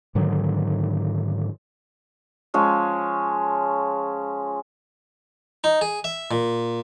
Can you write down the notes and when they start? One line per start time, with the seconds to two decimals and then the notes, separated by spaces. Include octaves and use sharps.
0.15 G#2 D3 D#3 F#3
2.54 F3 G#3 C#4
5.64 D#4
5.81 G#4
6.04 E5
6.31 A#2